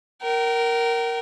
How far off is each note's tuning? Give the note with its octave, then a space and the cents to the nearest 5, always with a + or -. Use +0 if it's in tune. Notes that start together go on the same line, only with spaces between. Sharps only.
A#4 +0 G5 -40